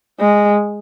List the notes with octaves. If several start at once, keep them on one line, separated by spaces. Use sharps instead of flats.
G#3